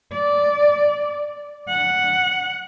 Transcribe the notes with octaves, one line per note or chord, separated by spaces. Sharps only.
D5
F#5